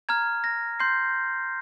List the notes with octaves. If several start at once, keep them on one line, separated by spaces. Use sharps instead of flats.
A#5 F6 G#6
A#6
C6 G6 C7